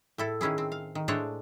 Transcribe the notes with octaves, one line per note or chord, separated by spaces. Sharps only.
A2 E4 A4
A2 D#3 C#4 E4 G#4
C4
F5
D#3
A2 G#3 A3 D4 C5 C#5